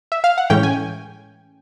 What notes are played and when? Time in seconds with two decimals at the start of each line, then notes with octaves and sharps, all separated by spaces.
0.12 E5
0.24 F5
0.38 F#5
0.50 A2 E3 G#3 C#4 G5
0.63 G#5